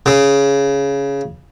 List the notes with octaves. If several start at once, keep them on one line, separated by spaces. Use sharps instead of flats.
C#3